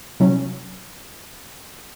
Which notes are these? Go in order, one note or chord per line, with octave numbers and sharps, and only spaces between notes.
C3 F#3 C#4